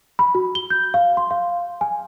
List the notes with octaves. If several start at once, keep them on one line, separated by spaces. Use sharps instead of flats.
B5
F#4
G7
G6
F5
C6
F5
G#5